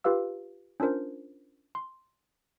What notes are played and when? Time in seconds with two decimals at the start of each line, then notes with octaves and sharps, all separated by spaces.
0.04 F4 G4 B4 F5 E6
0.80 C#4 D4 F4 A#4 C5
1.75 C6